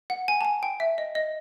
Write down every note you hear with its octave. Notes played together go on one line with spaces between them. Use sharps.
F#5
G#5
A5
G#5
G5
E5
D#5
D#5